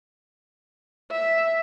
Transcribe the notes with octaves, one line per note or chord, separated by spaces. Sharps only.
E5